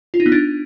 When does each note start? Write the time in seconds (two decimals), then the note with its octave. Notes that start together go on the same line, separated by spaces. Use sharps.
0.14 F4
0.20 D#4
0.26 B3
0.32 D4